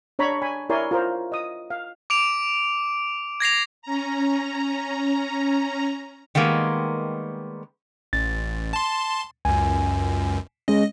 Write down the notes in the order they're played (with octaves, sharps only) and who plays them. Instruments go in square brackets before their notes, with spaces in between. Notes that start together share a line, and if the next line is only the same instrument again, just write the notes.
[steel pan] D4 C#5 A#5 B5
G#5 B5
E4 A#4 C#5 D5 G#5 C6
F4 A#4 C5
D#5 D#6
F5
[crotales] D6 D7 F7
G#6 A#6 C7 F7
[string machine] C#4 A#5
[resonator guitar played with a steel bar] D#3 G3 G#3 A#3 B3
[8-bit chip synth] A1 [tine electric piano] A6
[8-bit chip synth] A5 C6
[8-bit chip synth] C#2 F#2 [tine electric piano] G#5
[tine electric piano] G#3 C#4 [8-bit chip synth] D#5